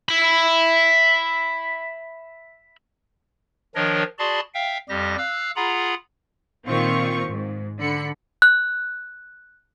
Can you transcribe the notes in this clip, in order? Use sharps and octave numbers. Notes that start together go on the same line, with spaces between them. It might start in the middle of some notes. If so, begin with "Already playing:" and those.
E5 B5
D#3 F3 D4 A#4 C#5 D#5
F#4 G#4 D5 A5 B5 C6
E5 F5 G5
F2 G3 G4 A#6
F5 E6 F#6
F4 G#4 F#5 A#5 B5
A#2 D#3 C4 F4 C#6
G#2
D3 B5 C#7
F#6